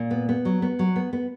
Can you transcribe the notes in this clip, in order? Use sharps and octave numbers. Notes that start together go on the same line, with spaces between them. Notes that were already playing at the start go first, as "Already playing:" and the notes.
Already playing: A#2
B3
B3
F#3
B3
F#3
B3
B3